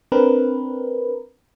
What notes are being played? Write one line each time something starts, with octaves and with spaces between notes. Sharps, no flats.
C4 D4 A#4 B4